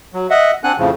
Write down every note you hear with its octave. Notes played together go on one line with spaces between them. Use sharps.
F#3
D#5 E5 F#5
C4 D4 F#5 G#5 F#6
F2 A2 C#3 F3